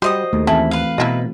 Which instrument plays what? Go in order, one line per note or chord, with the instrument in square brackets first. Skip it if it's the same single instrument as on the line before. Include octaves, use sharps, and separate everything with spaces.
[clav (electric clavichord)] G3 [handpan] F#4 [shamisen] G4 [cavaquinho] C5 D#5 D#6
[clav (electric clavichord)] D#2 [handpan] A3
[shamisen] C#3 A5 [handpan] E3 C4 [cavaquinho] E4
[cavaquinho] B4 F5
[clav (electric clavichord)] B2 [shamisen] F#3 E4 D#5